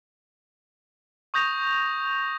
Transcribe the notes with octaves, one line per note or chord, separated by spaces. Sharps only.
C#6 D#6 G6 A#6 F7